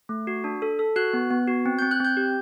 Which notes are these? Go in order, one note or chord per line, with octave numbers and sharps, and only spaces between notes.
A3
F#4
D4
A4
A4
F#4 F#6
B3
B3
F#4
C4
C4 G6
F#6
C4 G6
G4